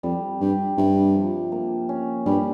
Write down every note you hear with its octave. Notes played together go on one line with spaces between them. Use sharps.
F2 G3
G2 G4
G2 C3
F3
A#3
C#4
G2 G3